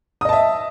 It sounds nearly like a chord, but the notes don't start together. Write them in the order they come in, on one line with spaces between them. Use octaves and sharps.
D#6 D#5 A5 E5